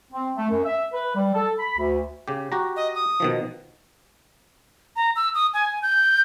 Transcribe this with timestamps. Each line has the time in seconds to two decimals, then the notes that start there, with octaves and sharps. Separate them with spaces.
0.13 C4
0.37 A3
0.49 F#2
0.65 E5
0.93 B4
1.15 G3
1.34 A4
1.59 B5
1.78 D2
2.28 C#3 G4
2.52 F#4 G4 A#5
2.76 D#5
2.95 D#6
3.20 B2 D#3 F3
4.96 A#5
5.16 E6
5.35 D#6
5.54 G#5
5.82 G6